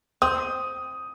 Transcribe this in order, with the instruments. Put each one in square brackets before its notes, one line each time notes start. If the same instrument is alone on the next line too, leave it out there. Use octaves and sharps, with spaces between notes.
[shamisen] C4 [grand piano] D#6